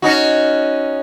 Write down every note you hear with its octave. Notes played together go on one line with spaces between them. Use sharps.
C#4 D#4 F#4